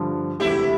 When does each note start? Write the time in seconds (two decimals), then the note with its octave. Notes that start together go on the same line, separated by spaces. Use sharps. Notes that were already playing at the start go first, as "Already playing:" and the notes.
Already playing: G2 D3 F3
0.40 E1 D2 C3 E3 E4 G4